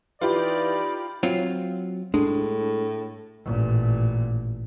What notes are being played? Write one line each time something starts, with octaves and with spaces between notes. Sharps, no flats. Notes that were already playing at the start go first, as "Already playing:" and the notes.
E3 D#4 F4 G4 D5 B5
F#3 C4 F4
A2 G#3 D4
A1 A#2